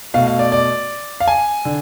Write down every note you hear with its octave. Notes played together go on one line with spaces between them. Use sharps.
B2 A3 F5
F5
D5
D5
F5
G#5
D3